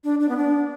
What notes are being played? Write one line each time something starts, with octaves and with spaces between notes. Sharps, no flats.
D4
D4
B3
D4